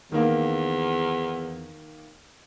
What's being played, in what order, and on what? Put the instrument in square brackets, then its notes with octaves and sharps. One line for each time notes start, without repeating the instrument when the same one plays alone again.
[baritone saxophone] E2 [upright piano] D#3 A#3